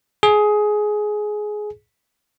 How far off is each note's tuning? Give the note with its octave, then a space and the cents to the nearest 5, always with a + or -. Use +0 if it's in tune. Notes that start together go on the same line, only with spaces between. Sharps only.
G#4 +15